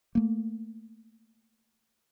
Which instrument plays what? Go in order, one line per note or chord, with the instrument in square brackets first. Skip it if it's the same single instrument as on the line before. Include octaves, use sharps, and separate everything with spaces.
[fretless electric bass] A3 A#3